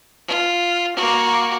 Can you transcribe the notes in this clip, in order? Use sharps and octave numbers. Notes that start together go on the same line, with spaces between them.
F4
A#3 F#4